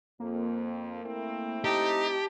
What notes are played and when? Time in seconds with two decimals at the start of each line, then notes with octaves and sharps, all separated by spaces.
0.20 F2 A#3
1.03 A3 C4 E4
1.65 D#4 G4 A5